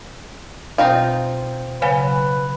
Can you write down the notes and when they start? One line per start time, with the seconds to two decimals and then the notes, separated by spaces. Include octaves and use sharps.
0.78 B2 C4 D#4 F4
1.82 C#3 F#3 B4 C#5 F5 G#5